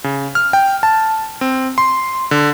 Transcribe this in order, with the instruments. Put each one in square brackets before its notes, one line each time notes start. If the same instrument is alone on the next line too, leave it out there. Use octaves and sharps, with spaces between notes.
[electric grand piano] C#3
F6
G5
A5
C4
C6
D3